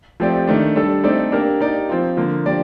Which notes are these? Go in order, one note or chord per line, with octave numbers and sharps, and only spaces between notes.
F3 A3 C4 G4 D5
D#3 A3 D4
G3 D4 A4
A3 C4 D#4 A4 D5
A#3 D4 G4 A#4
A#3 D#4 G4 D5
F3 C4 F4
D3 F3 A#3
F3 A#3 D4 G4 D5